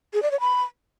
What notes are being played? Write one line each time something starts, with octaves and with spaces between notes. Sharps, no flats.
G#4
D5
C#5
B5